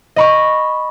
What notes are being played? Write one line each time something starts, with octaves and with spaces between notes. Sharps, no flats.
D#5 B5 C#6